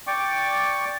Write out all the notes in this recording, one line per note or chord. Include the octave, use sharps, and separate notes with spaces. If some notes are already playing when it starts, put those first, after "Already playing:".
D5 G5 C#6 D6